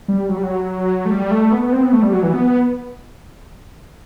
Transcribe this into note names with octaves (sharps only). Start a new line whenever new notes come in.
G3
F#3
G3
F#3
A3
G3
A3
B3
B3
C4
B3
A3
G3
F#3
E3
B3